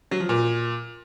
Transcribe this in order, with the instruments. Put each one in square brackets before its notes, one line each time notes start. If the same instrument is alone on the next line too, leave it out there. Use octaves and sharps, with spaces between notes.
[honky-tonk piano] F#3
F3
A#2